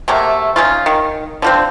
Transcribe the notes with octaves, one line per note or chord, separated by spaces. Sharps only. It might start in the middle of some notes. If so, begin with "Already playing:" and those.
C3 F#3 A3 A#3
C#4 D#4 F4
D#3
D3 F3 C4